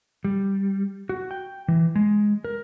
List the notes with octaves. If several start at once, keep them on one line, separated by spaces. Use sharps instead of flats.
G3
F#4
G5
E3
G#3
A#4